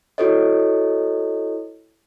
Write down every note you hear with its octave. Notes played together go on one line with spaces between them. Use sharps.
E4 F#4 A4 C#5 D#5